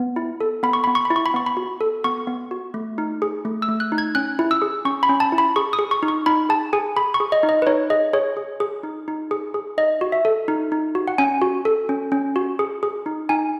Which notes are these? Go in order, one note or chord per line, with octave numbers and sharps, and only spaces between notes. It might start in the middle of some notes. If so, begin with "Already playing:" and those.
Already playing: B3
E4
A4
B3 B5
C#6
B3 B5
C#6
B5
E4
C#6
B5
B3 C#6
B5
F#4
A4
B3 C#6
B3
F#4
A3
D#4
G#4
A3
E6
A3
F#6
D#4
G#6
C#4 F#6
E4
E6
G#4
C#4 C#6
B5
C#4
A5
E4
B5
G#4 C#6
D#6
G#4
C#6
D#4
C#6
D#4 B5
G#4 A5
G#4 G#5
G#4 B5
C#6
G#4
D#5
D#4
D#5
B4
D#4 C#5
G#4 D#5
G#4 C#5
G#4
G#4
D#4
D#4
G#4
G#4
D#4 D#5
F#4
E5
A4
D#4
D#4
F#4
F#5
C#4 G#5
F#4
A4
C#4
C#4
F#4
G#4
G#4
D#4
D#4 G#5